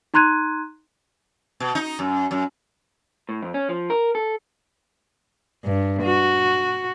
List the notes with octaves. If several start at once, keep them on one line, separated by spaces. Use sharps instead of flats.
D#4 A#5 C6 F#6 G#6 D#7
B2
D#4
F#2
F#2
A2
F2
C#4
F3
A#4
A4
G2
F#4